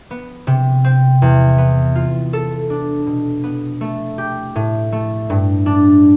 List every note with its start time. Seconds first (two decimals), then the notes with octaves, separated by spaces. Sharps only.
0.11 B3
0.47 C3
0.84 C4
1.22 E2
1.58 B3
1.95 F4
2.33 A4
2.70 D4
3.06 B2
3.43 B3
3.81 A3
4.18 G4
4.55 A2
4.92 A3
5.30 G2
5.66 D4